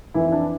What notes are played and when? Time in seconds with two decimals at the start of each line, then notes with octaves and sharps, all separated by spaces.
0.14 F2 E3 E4
0.28 E4
0.32 D4